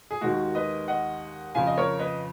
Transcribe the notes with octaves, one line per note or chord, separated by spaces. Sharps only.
G#4
D#2 D#3 G#3 F#4
B4 D#5
D#5 F#5
F2 C#3 F3 F5 G#5
D#5
A#4 C#5
B4 D#5